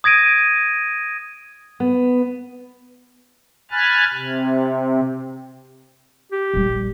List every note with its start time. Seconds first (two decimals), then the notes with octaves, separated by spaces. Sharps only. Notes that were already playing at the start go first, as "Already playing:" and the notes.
0.04 D#6 G#6 A#6 D7 D#7
1.80 B3
3.71 G#5 B5 F6 F#6 A6
4.13 C3
6.32 G4
6.54 A#1 G3